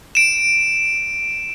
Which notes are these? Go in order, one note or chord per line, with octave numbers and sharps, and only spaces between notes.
D7 E7